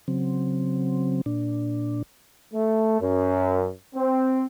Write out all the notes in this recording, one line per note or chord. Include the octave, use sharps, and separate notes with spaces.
C#3 F#3 C4
A#2 D4
A3
F#2
C4